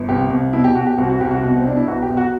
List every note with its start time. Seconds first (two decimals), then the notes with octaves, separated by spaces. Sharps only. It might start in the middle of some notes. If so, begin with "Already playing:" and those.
Already playing: G1
0.08 C2 G4
0.30 C2
0.53 B2 E4
0.64 G4
0.75 B2 F#4
0.87 G4
0.98 C2 F#4
1.09 F#4
1.21 C2 G4
1.31 F#4
1.42 B2 F#4
1.56 C4
1.65 B2 D4
1.77 E4
1.88 B1 F#4
2.02 G4
2.10 B1
2.17 F#4